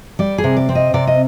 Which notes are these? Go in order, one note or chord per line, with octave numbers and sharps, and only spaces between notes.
G3 D5
G#4
C3
D5
C4
D#5
C3 D5
D#5